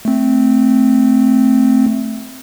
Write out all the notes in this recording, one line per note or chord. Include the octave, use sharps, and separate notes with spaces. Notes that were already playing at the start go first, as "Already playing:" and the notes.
A3 C4